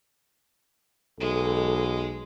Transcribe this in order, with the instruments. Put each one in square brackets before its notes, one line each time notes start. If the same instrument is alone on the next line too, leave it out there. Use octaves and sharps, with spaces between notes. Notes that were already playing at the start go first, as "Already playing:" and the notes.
[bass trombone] B1 [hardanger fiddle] G#3 [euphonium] A4